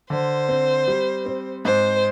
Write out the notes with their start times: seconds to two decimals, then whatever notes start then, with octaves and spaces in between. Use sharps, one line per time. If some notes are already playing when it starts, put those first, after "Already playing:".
0.10 D3 C5
0.49 C4
0.88 G3
1.26 C4
1.65 G#2 C5